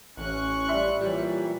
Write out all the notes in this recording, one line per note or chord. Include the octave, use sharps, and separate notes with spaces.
A1 C#4 C#6 F#6
G3 E5 C6
A#2 E3 G3 G4 C#5 E5